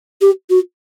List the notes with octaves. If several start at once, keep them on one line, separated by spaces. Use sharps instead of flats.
G4
F#4